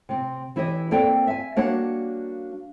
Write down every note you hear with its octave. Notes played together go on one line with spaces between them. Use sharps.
C3 C4
E3 E4 G4 C#5 D#5
A#3 C4 A4 D5 G5
E5 G#5
G3 A#3 D4 F#4 C#5 F#5